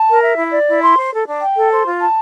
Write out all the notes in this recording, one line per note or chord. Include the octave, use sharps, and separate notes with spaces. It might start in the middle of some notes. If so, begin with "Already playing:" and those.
Already playing: A5
A#4
E5
E4
D5
E4
C6
C5
A4
D4
G5
A4
C5
F4
A5